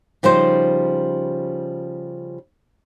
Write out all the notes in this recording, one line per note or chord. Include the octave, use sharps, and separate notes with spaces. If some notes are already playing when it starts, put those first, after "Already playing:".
C#3 F3 G3 D#4 C5